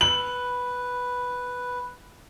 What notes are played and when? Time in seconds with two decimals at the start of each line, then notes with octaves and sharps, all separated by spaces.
0.01 B4 F#7